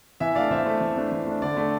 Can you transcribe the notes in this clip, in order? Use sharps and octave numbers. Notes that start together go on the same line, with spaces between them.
E3 E5 G#5
A3 D4 D5 F5
E3 C5 E5
A3 D4
E3
A3 D4
E3
A3 D4
D3 D5
A3 D4